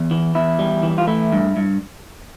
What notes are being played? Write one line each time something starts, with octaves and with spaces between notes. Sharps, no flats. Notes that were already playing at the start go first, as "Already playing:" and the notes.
Already playing: E2
E3
E2 E4
G3
E3
F4
A3 E4
G2
G2